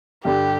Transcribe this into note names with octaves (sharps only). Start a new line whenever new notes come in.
G2 D3 G3 G4